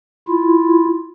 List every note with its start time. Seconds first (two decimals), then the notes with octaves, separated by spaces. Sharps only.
0.28 E4 F4